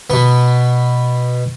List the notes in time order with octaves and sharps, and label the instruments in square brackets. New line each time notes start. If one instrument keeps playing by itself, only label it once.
[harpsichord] B2 B3